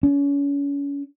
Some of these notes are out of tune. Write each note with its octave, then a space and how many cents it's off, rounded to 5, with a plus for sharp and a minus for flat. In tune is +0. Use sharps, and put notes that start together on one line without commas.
C#4 +30